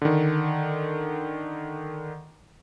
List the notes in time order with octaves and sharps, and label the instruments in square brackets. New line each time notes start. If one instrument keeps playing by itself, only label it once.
[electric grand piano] D3 D#3